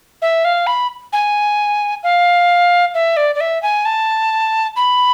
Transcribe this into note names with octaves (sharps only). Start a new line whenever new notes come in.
E5
F5
B5
G#5
F5
E5
D5
D5
E5
G#5
A5
B5